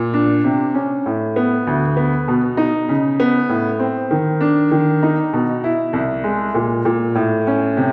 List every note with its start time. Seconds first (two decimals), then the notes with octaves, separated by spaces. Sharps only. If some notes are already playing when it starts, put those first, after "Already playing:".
Already playing: A#2
0.14 D4
0.44 C3
0.74 C#4
1.06 A2
1.36 B3
1.67 D2
1.97 B3
2.28 B2
2.57 D#4
2.89 C#3
3.20 B3
3.49 A2
3.79 C4
4.11 D#3
4.41 D4
4.71 D#3
5.03 D#4
5.33 B2
5.64 E4
5.93 C2
6.24 G#3
6.55 A#2
6.85 A#2
7.15 A2
7.47 C#4
7.77 C3